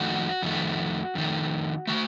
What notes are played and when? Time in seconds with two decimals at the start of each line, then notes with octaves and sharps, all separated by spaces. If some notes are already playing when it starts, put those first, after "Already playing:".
Already playing: F2 D#3 A3 F#4
0.42 F2 D#3 A3
1.15 F2 D#3 A3
1.87 D#3 A3 F#4